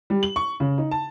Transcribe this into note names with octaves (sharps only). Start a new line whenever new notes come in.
G3
F#7
C#6
C#3
D#4
A5